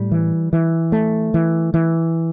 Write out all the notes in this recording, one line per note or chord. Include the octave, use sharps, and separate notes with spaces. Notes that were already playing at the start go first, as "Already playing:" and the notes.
Already playing: A2 G3
E3
E3
A3
E3
E3